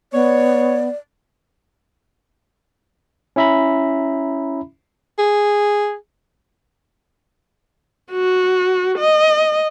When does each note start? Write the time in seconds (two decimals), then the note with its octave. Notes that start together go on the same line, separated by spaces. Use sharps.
0.13 B3 C#5 D5
3.36 C#4 E4 E5 A#5 B5
5.18 G#4
8.12 F#4
8.98 D#5